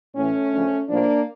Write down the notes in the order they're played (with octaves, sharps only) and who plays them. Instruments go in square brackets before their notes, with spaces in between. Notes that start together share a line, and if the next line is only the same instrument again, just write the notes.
[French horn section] A2 E3 A3 C#4
D2 C#3 F3
A2 F3 A#3 D4